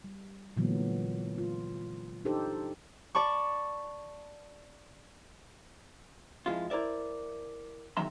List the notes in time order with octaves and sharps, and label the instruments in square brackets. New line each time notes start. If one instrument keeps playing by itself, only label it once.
[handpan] G3
A#2 D3 E3 F#3 G#3 B3
F4
D4 D#4 G4 A4 C5
[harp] D5 A5 B5 C#6
[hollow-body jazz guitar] F2 F3 G#3 E4 F4
E4 A#4 C5 D5 E5
E2 D#3 F#3 E5 A#5 C6